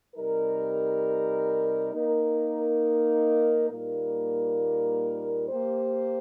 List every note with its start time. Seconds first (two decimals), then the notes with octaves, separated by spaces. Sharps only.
0.16 C3 G3 D#4 A#4
1.93 A#3 D#4 A#4
3.71 A#2 G3 A#3 D#4 A#4
5.49 A#3 G4 C5